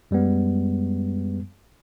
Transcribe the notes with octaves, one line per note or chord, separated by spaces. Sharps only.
F#2 G3 G#3 B3